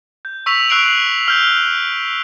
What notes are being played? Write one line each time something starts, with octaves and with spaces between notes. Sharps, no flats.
G6
C#6 E6 B6 F7 F#7
C#6 E6 F#6 C7 D7 F#7
F6 G6 G7